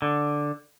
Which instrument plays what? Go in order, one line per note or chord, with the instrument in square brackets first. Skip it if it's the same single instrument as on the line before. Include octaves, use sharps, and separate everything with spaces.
[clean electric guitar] D3